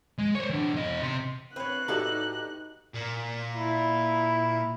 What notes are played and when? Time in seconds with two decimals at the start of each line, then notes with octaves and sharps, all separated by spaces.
0.18 G#3
0.35 C5 C#5
0.50 E3 D4
0.75 E2 D#5
1.02 C3 C6
1.56 C4 B4 C#5 F#6
1.88 A2 D#4 F#4 G4 A4 D5
2.94 A#2
3.55 E4